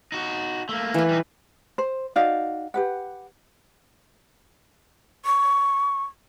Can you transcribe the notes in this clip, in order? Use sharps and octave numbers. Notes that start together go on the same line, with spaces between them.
D#4 F#4
A3 A#3
E3 B4
G3 D#4
C5
D#4 F#4 D5 F5
G4 B4 F#5
C#6